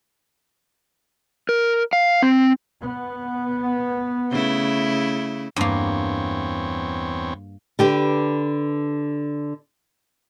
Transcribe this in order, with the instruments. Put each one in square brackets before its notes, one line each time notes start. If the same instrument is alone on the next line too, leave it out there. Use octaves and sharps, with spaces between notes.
[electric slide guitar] A#4
F5
C4
[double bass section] B3
[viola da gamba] C#3 A3 E4
[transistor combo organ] E2 C4 C#5 [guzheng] G2 A#3
[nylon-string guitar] D3 G4 B4